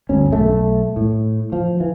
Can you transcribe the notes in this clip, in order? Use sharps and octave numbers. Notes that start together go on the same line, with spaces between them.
G1 D2 C#4
B1 A3
A2
F3
E3